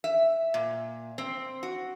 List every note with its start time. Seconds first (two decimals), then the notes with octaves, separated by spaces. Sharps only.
0.04 E5
0.54 A#2
1.18 C4
1.63 F#4